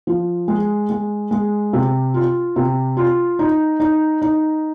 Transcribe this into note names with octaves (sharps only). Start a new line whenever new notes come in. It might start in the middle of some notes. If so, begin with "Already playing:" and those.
F3
G#3
G#3
G#3
C3
F4
C3
F4
D#4
D#4
D#4